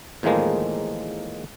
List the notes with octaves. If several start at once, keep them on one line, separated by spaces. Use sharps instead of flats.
E2 A2 D#3 F3 G#3 A#3